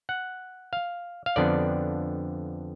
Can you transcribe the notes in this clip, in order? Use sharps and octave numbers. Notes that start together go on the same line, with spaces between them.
F#5
F5
F5
F2 D3 F3 B3 D4 D5